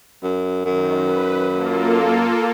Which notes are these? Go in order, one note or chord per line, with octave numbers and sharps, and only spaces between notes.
F#2
F#2 D#3
B4
A#3 F4 A4